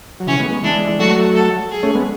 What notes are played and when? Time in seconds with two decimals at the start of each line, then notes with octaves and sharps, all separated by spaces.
0.20 F#3
0.27 C#3 E3 C#4
0.39 G#3 B3
0.51 G#3 B3
0.63 E3 G#3 D4
0.99 F#3 A3 F#4
1.35 A4
1.70 G#4
1.83 A3 C#4
1.95 G#3 B3